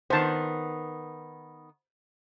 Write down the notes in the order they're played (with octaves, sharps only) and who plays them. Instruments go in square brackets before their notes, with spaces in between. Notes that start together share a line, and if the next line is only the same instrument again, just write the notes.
[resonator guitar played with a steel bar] D#3 B3 [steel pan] C5 A5